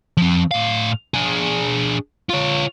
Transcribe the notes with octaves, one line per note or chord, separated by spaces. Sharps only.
F3 C4
A2 F5
D4 G#4
F4 C#5